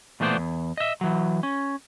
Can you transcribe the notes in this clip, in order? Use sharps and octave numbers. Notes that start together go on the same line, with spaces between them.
A#2 E3 A3 B3 C5 D5
E2
D#5 E5
E3 F#3
C#4